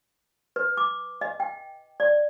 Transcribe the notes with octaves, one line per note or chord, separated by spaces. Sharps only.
B4
D6
D#5
G5
D5